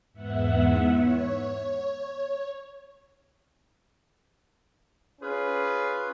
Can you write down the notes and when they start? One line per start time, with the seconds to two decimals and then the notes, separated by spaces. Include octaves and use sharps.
0.13 E2 G#2 B3 E5 F#5
0.90 C#5
5.22 C#4 F4 G#4 B4